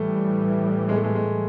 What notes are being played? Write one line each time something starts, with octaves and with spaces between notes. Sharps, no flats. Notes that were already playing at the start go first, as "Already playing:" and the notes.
Already playing: A2 E3 G3 A3
G#3
A3
G#3
G#3